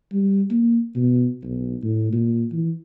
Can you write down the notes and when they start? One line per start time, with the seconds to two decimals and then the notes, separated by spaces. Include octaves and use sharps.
0.12 G3
0.50 A#3
0.95 B2
1.43 B1
1.83 A2
2.13 A#2
2.52 E3